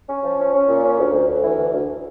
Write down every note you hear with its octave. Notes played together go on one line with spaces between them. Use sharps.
C#4
F3
C#4
C#4
A#2
C#4
D2
D2
D2
E3
D2
D2